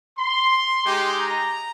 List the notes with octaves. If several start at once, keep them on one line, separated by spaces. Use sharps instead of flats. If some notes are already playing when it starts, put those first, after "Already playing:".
C6
G#3 D#4 G4
A#5